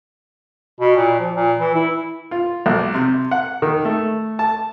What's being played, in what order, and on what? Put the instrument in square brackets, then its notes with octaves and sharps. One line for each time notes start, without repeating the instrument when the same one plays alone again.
[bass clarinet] B2
A#2
F3
A#2
E3
E4
[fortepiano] F4
B1
C3
F#5
D#3
A3
A5